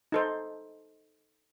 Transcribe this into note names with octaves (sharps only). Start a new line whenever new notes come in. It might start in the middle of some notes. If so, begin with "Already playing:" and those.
D#4 A4 C5